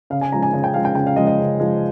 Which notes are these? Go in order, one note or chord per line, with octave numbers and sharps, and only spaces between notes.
C#3 F5
G#5
F3 G#3 A#5
G#5
C#3 G#5
G5
F3 G#3 F5
G5
C#3 G5
F5
F3 G#3 D#5
D#5
C#3
F3 G#3